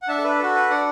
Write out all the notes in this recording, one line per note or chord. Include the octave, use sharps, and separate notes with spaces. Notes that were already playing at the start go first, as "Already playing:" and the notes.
F#5
D4 E5 A5
A4
B4
F#4 A4
B4
D4 D5 F#5